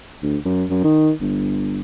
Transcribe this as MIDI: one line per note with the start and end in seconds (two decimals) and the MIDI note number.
0.23 0.37 38
0.45 0.65 42
0.70 0.82 42
0.84 1.11 51
1.21 1.81 31